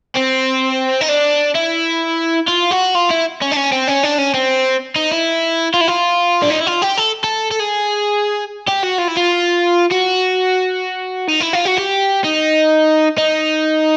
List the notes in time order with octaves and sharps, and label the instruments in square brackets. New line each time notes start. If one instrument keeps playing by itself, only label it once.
[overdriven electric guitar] C4
D#4
D4
E4
F4
F#4
F4
E4
C#4
D4
C#4
C4
C#4
D4
C#4
C4
D#4
E4
F4
E4
F4
D4
D#4
E4
F4
G4
A4
A4
A4
G#4
G4
F#4
F4
E4
F4
F#4
D#4
E4
F4
F#4
G4
D#4
D#4